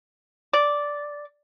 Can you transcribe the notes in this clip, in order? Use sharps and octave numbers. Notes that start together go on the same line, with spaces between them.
D5